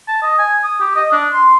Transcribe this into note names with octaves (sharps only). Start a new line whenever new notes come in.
A5
D#5
G#5
D#6
G4
D#5
D4
C6